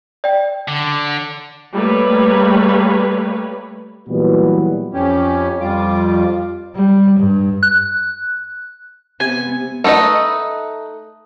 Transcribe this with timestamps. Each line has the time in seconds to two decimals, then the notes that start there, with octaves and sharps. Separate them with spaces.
0.24 D5 G5
0.68 D3
1.74 G3 A3 A#3 B4 C#5
4.08 A#2 E3 F#3 G3 B3 F#4
4.94 F2 C#4 G4
5.61 F2 G3 F4 D6
6.75 G3
7.19 G2
7.63 F#6
9.20 C3 B3 G#5
9.84 A3 D#4 F4 B4 D#5